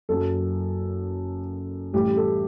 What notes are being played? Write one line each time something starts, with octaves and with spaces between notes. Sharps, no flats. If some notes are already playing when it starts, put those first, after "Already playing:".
F#1 F#2 F#3 A4
A1 A2 G3 G4
A4